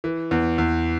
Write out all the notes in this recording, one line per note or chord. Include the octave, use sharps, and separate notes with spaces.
E3
E2
E2